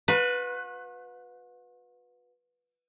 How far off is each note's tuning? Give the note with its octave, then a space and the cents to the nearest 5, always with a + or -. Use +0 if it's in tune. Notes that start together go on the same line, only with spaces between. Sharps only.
F#4 -45 B4 +0